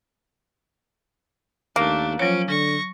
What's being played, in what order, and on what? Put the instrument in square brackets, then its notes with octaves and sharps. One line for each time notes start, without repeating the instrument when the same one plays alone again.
[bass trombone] D#2 [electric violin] A3 D4 [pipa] A#3
[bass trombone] F3 [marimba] F#3 C#5 [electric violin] C#4 D7
[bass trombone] D3 [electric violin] C#6 A#6